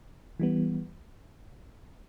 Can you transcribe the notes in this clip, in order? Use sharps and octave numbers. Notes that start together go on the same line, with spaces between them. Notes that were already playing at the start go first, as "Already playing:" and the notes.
E3 G3 B3